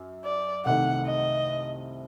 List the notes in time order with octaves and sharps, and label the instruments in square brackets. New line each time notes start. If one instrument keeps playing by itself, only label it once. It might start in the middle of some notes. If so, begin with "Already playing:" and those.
Already playing: [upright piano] F#2
[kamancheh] D5
[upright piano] C2 C3 D#3 A3 [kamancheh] F#5
[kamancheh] D#5